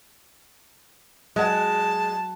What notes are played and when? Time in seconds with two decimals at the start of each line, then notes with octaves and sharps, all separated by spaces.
1.36 F#3 G#3 F#5 A5